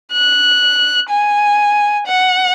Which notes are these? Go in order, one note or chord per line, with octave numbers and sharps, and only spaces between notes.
F#6
G#5
F#5